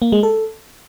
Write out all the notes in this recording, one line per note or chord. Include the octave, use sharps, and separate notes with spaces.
A#3
G#3
A4